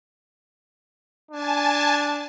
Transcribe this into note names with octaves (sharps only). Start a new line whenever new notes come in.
D4 G#5 A5